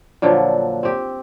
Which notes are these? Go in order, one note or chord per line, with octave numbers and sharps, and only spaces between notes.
A#2 D3 F3 F#3
C4 G4